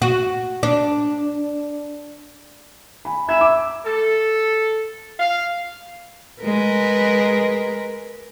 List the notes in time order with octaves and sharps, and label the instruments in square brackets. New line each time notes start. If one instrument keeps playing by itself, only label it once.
[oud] F#4
D4
[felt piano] G#5 B5
[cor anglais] E5 [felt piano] G#5 B5 G#6
[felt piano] D6 E6
[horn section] A4
F5
[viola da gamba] G#3 A#4 B4